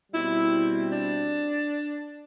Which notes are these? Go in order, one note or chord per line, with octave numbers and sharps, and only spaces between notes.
B2 G3 C4 E4
D4